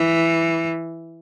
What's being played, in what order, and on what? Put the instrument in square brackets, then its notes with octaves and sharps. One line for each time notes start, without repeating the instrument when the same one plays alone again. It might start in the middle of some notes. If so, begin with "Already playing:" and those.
Already playing: [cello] E3